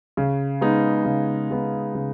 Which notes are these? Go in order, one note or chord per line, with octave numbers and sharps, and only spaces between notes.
C#3
G#3 B3 D#4
C#3
G#3 B3 D#4
C#3